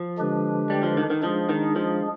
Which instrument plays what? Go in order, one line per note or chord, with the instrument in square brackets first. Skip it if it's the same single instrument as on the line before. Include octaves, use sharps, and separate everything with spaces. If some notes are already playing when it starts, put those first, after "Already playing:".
Already playing: [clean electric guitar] F3
[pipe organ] D3 G#3 D4 G4 B4
[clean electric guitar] G3
F3
D#3
D#3
[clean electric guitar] F3 [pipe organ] G#3 D4 G#4
[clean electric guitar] D#3
F3